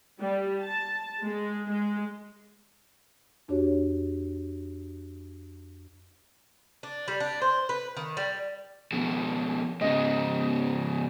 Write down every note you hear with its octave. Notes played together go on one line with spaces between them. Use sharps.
G3
A5
G#3
G#3
F2 D4 F#4 G4 C#5
D4
G3
D4
C5
B4
D#3
G3
F2 B2
G#2 C#3 D#5